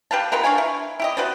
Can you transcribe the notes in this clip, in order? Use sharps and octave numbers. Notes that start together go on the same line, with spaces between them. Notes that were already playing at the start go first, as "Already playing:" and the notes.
G4 B4 F5 A5
B3 F4 A#4 B4
D4 C#5 F5 G#5
E4
E4 G4 D#5
F#4 B4 C5 D5